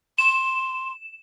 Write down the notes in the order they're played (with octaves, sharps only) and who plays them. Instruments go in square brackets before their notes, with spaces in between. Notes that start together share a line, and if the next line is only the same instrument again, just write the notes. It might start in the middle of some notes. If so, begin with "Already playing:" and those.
[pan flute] C6 [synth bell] E7